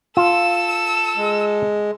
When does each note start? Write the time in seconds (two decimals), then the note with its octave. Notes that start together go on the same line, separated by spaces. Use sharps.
0.17 F4 A4 E6
1.17 G#3